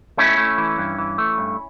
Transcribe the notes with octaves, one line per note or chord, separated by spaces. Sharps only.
A3 C#4 E4
A3
E3
G2
E3
A3
G2